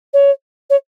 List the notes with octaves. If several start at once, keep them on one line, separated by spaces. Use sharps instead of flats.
C#5
C#5